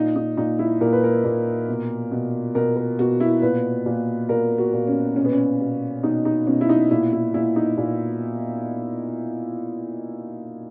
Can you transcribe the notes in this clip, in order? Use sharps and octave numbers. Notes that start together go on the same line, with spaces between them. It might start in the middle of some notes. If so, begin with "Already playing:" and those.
Already playing: A#2 D#4
D#4
A#2 D#4
E4
A#2 A#4
B4
A#4
A#2
B2
B2
B2 A#4
A#4
B2 F#4
E4
A#2 B4
A#2
A#2 A#4
F#4
A#2
C#4
B2 C#4
B3
C#4
B2
B2 D#4
D#4
B2 C#4
E4
D#4
A#2 E4
E4
A#2 E4
D#4
A#2